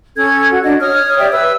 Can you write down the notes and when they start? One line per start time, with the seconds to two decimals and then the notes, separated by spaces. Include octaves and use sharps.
0.17 C#4 A4 G#6
0.50 F#4
0.64 D4 D#5
0.80 C#5 D#6 F6
1.19 G4 D5 E5 G5
1.32 B4 E5 E6